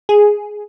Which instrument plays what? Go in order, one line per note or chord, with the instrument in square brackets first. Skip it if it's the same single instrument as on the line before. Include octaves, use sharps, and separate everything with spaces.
[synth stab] G#4